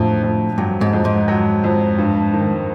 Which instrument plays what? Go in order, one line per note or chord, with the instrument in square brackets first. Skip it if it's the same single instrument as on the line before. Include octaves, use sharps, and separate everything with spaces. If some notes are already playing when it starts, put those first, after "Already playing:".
Already playing: [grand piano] F2 D3 F#3 [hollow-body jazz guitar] A2
[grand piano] F2
[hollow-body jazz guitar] G2 [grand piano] F#3
[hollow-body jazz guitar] G#2
[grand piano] F2
[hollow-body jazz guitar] G#2
[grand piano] F#3
F2
G2
D#3